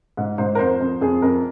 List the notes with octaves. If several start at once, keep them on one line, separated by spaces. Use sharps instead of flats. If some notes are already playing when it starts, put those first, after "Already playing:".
G#2
G#2 C5
A#4
F2 C5
F2
F2 G#4
F2 A#4